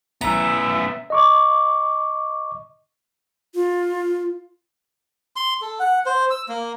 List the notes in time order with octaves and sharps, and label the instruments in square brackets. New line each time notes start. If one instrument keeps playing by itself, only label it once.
[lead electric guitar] B3 C#4 [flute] E4 [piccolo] E5 [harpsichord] A#5
[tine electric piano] D#5 C#6 D6
[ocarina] F4
[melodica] C6
A4
F#5
C5
E6
A#3